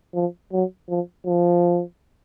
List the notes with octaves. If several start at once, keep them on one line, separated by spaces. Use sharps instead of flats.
F3
F#3
F3
F3